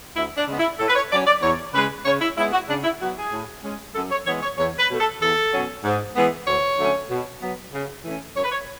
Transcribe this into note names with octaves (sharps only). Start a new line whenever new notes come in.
D2 E4
D4
C#3 G#3 B3
E4
A2 A4
B4
C#5
F#3 C#4 D5
D5
E2 C#5
C#3 G#3 B4
C#3 C#5
E4
G#3 B3 E4
F#4
C#3 D4
E4
F#3 B3 F#4
G#4
A2
G#3 C#4
F#2 A4
C#5
E3 G#3 B3 C#5
C#5
E2 C#5
B4
B2 A3
A4
E2 A4
B2 F#3 C#4
G#2
E3 G#3 B3
D2 C#5
D3 F#3 A3 C#4
B2
F#3 B3
C#3
E3 A3 C#4
F#2 C#5
B4
C#5